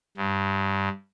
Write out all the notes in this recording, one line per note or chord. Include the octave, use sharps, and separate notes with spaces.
G2